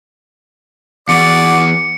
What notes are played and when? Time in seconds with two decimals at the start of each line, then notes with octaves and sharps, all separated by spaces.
1.09 E2 F#4 D5 C#7